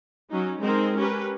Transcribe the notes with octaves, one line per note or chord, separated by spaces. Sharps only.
F#3 C#4 D#4
G#3 C4 D#4 G#4 A#4
C#4 G4 A#4 B4